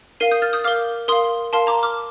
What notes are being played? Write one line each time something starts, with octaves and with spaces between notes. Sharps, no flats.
A#4 F5 C7 D#7
D#6 G6
F6 A6
D#6 G6
A#4 F5 D6 F6
A#4 F5 C6 D#6
A#4 F5 A5 C6
A#5 D6
D6 F6